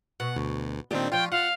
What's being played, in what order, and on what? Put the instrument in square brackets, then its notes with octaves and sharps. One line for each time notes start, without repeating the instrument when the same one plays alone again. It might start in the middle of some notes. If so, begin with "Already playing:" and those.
[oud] B2 [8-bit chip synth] F#5
[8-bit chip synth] D2
[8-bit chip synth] A#2 D#3 C4 [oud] D4 D#4 G4
[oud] F3 C#5 [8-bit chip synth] F4 [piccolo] G5
[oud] F4 [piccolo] F5 [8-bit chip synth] F#5